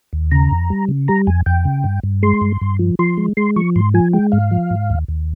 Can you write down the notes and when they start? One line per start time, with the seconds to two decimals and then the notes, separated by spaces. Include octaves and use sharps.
0.13 D#2
0.31 C#3 A#5
0.51 F2
0.70 G3
0.88 C#3
1.08 G3 A#5
1.27 F2 G#5
1.46 F2 G5
1.65 C#3
1.84 G2
2.03 G2
2.23 G#3 C6
2.41 G2
2.61 G2
2.79 F3
2.99 F3 C6
3.17 G#3
3.37 G#3 C6
3.56 F3 C#6
3.76 G#2 C6
3.94 F3 G#5
4.13 G#3 G5
4.32 G#2 F5
4.51 F3
4.71 G#2
4.90 D#2
5.08 D#2